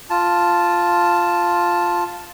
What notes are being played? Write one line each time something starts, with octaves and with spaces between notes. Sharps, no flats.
F4 A5